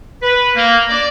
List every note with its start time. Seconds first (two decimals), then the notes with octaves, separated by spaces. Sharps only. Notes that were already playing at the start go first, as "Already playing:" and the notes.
0.22 B4
0.55 A#3
0.89 D5